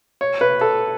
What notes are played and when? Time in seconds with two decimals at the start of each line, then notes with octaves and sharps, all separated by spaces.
0.21 C#5
0.41 B4
0.61 A4